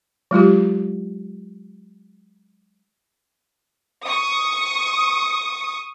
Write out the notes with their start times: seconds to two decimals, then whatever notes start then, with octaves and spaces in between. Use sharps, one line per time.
0.31 F#3 G#3 F4 G4
4.07 C#6 D#6